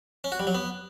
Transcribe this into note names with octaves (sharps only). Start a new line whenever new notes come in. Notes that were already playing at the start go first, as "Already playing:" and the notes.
C#4
F#4
G3
F#3
B3